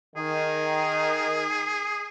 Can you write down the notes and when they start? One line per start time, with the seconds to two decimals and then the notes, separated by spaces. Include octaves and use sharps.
0.16 D#3 G#4